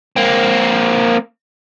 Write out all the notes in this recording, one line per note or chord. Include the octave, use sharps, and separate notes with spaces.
A#3 C4